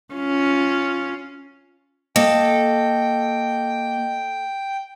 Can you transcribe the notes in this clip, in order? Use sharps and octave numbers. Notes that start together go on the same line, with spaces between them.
C#4 F4
A#3 A4 D#5 G5